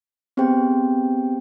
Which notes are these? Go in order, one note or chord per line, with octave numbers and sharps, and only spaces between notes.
B3 C4 G4 G#4 C5 G5